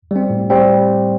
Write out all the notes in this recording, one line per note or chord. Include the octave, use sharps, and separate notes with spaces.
G3 C4
A2
G3 C4